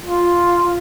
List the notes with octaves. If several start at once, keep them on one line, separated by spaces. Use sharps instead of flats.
F4